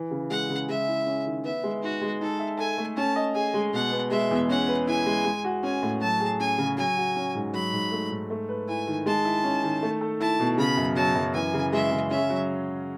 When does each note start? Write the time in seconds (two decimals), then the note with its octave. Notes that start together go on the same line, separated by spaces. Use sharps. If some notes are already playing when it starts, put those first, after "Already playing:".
Already playing: E3
0.11 C#3
0.30 G#3 F#5
0.49 C#3
0.68 G#3 E5
0.87 E4
1.06 C#4
1.26 D#3
1.44 B3 E5
1.63 G#3
1.82 D#4 F#4
2.01 G#3
2.21 D#4 A4
2.39 E5
2.58 A4 G#5
2.78 A3
2.97 C#4 A5
3.16 D#5
3.35 G#4 G#5
3.54 G#3
3.73 B2 F#5
3.92 B3
4.10 G#3 E5
4.31 E2
4.49 C#4 F#5
4.68 B4
4.87 E4 G#5
5.06 G#3
5.25 G#3
5.44 F#4
5.63 C#4 G#5
5.82 A2
6.01 F#3 A5
6.20 G#4
6.40 C#4 G#5
6.58 C#3
6.77 F#3 G#5
6.96 F#4
7.16 C#4
7.35 G#2
7.53 F#3 B5
7.73 G#2
7.92 A3
8.11 G#2
8.30 A3
8.49 B4
8.68 E4 G#5
8.87 D#3
9.06 G#3 A5
9.25 E4
9.44 C#4
9.63 D#3
9.82 A3
10.01 A4
10.20 E4 A5
10.39 B2
10.58 C#3 B5
10.77 F#2
10.96 F#3 A5
11.15 F#2
11.34 E3 G#5
11.54 C#3
11.72 G#3 E5
11.91 C#3
12.11 C#4 E5
12.30 F#3